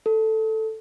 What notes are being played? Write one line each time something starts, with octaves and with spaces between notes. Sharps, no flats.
A4